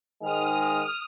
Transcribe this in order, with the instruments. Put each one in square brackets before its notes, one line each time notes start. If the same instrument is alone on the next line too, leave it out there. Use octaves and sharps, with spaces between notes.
[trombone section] G#2 D#3 G#3 [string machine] D#6 F6